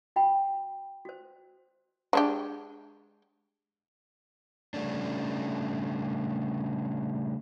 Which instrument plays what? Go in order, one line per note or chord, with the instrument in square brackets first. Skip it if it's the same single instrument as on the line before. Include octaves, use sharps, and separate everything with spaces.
[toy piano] F#4 G5 B5
F#4 C5
[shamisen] G#3 D4 G4
[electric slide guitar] C#3 G3 A3 C#4 D4